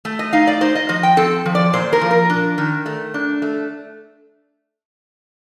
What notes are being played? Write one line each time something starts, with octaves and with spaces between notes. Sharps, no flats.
A3
D#5
D#4 F5
D5
D#4 C5
D#5
F3 D#5
G5
C4 A4
F3
D5
A#2 C5
A#4
F3
A#4
D4
D#3
A3
D4
A3